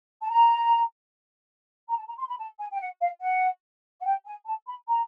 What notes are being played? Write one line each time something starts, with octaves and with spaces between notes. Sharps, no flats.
A5
A#5
A#5
A5
A#5
C6
B5
A5
G#5
G5
F#5
F5
F#5
F#5
G5
G#5
A5
B5
A#5